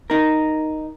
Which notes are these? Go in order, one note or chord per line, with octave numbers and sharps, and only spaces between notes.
D#4 A#4